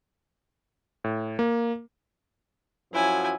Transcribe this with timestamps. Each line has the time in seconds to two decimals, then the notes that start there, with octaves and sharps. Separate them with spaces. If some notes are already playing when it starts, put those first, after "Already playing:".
1.04 A2
1.39 A#3
2.93 F#2 F3 F#3 E4 G#5